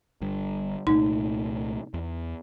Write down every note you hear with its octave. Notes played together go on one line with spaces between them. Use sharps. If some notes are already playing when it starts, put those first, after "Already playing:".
G1 G2
C2 A#2 A3 D#4
E2